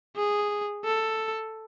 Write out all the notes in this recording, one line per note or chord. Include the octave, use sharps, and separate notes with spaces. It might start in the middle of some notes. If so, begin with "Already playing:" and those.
G#4
A4